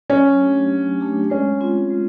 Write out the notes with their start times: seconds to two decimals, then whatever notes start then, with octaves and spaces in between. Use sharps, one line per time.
0.10 F#3 C#4
0.40 A3 D4 G4
0.70 F#3
1.00 A3 D4 G4
1.30 G#3 C#4
1.61 C4 F4
1.90 G#3